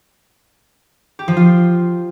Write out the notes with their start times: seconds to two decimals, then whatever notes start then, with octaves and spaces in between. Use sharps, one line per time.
1.19 G4
1.28 F3
1.37 F4